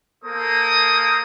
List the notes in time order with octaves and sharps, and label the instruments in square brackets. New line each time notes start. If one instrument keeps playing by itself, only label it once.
[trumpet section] A#3 A4 A#4 C5 D#6